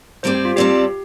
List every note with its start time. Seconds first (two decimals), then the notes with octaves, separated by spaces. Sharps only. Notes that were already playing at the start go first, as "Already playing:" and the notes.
0.23 G2 G3 C4 A4 C5 D5
0.35 G4
0.45 F4
0.56 G2 G3 C4 G4 A4 D5